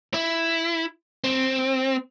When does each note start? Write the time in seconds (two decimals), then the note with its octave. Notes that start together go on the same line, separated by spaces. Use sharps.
0.14 E4
1.24 C4